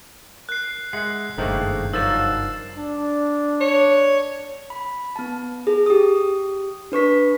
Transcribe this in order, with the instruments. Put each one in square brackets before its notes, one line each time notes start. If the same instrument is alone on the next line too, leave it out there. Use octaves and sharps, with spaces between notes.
[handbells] A#4 [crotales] F#6 C7
[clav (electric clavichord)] G#3 F#5 [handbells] E5 [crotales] C7
[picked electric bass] F#1 G2 [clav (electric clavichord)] D#3 A3 A#3 [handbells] G#4 C5 D#5
[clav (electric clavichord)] F3 F#3 [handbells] D#4 A#4 D5 [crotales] E6 A6 E7
[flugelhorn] D4
[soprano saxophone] C#5
[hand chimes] B5
B3 A5
G#4
G4 D#6
D4 B4 C#6 B6